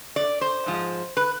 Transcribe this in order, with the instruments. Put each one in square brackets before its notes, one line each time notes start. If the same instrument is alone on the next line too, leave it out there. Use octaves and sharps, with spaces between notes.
[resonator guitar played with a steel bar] D5
C5
G#2 F3 G#3
B4